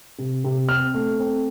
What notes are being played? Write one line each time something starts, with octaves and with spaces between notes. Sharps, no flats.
C3
C3
C4 F6
A3
C4